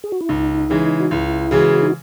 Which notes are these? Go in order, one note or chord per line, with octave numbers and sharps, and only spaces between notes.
G#4
F#4
E4
C#2 D#4
C#3 E3 G#3
F#4
C#2 E4
C#3 E3 G#3 F#4
D#4